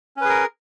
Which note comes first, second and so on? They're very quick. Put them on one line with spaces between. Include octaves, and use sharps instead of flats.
C#4 B4 G#4 A#4